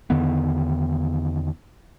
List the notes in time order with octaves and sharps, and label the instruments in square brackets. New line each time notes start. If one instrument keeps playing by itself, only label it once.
[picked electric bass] E2 D3 D#3 B3